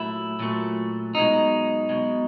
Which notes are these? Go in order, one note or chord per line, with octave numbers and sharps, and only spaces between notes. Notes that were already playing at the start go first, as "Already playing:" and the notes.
Already playing: A#2 F#3 A3 E4
A#2 F#3 A3
B1 B2 G#3 D#4
B1 B2 G#3